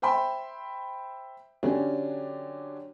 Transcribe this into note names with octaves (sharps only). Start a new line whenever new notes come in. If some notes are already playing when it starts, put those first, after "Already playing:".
C5 E5 G5 B5 C6
D3 F#3 C#4 D4 G4